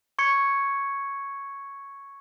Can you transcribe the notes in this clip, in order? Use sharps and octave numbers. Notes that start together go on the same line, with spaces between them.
C#6 G#6 C#7